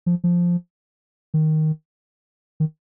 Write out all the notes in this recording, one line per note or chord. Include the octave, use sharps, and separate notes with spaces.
F3
F3
D#3
D#3